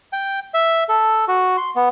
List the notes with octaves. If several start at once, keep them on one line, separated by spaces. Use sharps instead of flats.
G5
E5
A4
F#4
C6
B3